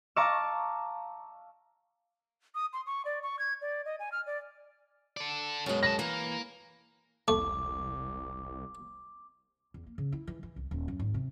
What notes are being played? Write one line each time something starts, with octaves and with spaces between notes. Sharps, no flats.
F5 A5 A#5 C#6 D6 E6
D#6
C6
C#6
D5
C#6
G#6
D5
D#5
G#5
F6
D5
A4 D5
C2 F#2 B2 G#3
B4 A5 A#6
E3 A#3
E1 C2 A3 D6
E2
A#3
C#3
E4
E3
E3
C2
D#1
F#2
G#1
C3